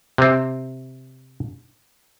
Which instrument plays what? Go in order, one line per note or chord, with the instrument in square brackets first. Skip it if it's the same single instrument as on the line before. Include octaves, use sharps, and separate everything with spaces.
[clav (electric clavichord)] C3 C4